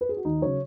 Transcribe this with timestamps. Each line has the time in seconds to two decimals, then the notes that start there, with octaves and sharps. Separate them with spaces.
0.01 B4
0.09 G#4
0.17 F#4
0.25 D#2 D#4
0.42 C#3 F#3 C#5